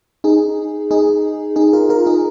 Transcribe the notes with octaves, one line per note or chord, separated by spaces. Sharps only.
D#4 G#4
D#4 G#4
D#4 G#4
F4 A#4
F4 A#4
D#4 G#4